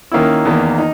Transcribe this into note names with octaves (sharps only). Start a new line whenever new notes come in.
D#3 A#3 C#4 E4
E2 D#3 A#3
D#4